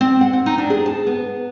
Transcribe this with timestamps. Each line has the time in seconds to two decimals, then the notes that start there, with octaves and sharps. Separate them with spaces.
0.01 C4
0.21 F#5
0.33 C4
0.46 D#4
0.58 D4
0.70 G#4
0.86 A5
1.07 B3